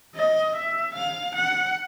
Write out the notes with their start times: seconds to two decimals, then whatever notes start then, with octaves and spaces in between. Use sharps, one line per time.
0.15 D#5
0.55 E5
0.94 F5
1.35 F#5